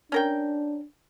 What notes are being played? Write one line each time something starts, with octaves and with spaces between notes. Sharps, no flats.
C#4 D4 A#4 G5